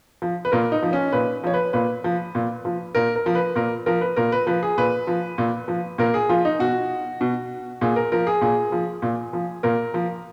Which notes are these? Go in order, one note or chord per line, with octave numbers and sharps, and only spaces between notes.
F3
B4
A#2 A#4
D#4
F3
C#4
A#2 B4
F3 C#5
B4
A#2 B4
F3
A#2
F3
A#2 A#4
A#4
F3
B4
A#2 A#4
F3 A#4
B4
A#2 A#4
B4
F3 B4
G#4
A#2 B4
F3
A#2
F3
A#2 A#4
G#4
F3 F4
D#4
B2 F#4
B2
A#2 G#4
A#4
F3 A#4
G#4
A#2 G#4
F3
A#2
F3
A#2 A#4
F3